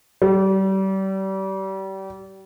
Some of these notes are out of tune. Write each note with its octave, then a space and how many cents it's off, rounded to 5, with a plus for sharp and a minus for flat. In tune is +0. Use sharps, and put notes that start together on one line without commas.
G3 -30